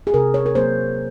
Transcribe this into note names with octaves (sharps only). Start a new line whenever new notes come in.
G#4
C3 A#4
C#5
A#4
F#3 A#3 C5